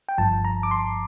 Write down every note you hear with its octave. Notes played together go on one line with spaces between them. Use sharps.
G5
G1 G2 F3 A5
A#5
D6
C6